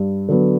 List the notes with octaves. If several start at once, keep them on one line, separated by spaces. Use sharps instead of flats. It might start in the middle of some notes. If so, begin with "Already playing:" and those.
Already playing: G2
D3 F#3 B3